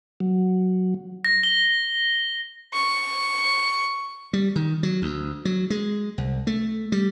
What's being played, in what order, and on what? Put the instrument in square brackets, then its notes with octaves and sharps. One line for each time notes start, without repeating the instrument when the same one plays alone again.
[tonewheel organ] F#3
[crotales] A#6
G7
[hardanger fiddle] C#6
[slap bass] G3
D#3
F#3
D2
F#3
G#3
C2
A3
G3